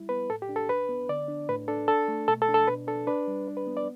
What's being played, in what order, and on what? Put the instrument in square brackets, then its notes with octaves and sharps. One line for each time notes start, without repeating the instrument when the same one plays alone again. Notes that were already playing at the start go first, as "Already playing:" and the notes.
Already playing: [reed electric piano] G3 E4
B3 B4
A2 A4
G4
D4
A4
D2 B4
B3
D3 D5
D4
A2 B4
D4 A4
D4 A4
A3
B2 A4
A4
D4
A4
B2 B4
D4 A4
D4 B4
G3
D4
B4
B3
D5